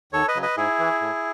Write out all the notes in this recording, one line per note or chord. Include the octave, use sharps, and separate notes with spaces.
D#2 A4 C#5
B4 D#5
C#3 F#3
B4 D#5
G#2 E4 G#4
E3
A2